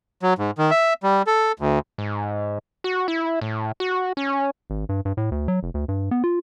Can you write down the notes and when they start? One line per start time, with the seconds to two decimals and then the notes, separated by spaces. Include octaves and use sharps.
0.23 F#3
0.38 G#2
0.58 D#3
0.71 E5
1.03 G3
1.27 A4
1.59 D2
1.98 G#2
2.84 F#4
3.08 E4
3.41 A2
3.80 F#4
4.17 C#4
4.70 G#1
4.89 G2
5.05 G2
5.17 A2
5.31 D2
5.48 F#3
5.63 F1
5.74 D2
5.88 G2
6.11 B3
6.24 F4